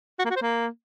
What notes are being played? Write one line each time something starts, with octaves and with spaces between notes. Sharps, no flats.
F#4
A#3
F#4
C5
A#3